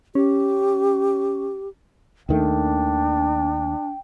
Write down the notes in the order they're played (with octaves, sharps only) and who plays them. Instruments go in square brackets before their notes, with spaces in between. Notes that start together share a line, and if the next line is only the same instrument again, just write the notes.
[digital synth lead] C#4 [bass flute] G4
[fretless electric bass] D#2 D#3 A3 [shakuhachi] D4 [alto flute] G5